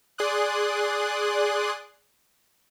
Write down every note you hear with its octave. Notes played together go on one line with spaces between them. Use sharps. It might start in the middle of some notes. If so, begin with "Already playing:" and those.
G#4 D5 C6 D#6 F#6